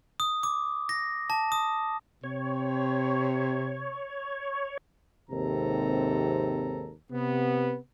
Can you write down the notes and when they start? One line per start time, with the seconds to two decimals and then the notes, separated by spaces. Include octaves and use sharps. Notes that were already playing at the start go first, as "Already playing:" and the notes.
0.20 D#6
0.43 D6
0.89 A#6
1.30 A5
1.52 D#6
2.24 C3 C#5
5.29 D#2 G#2 C3 C4 A4 A#5
7.11 C3 B3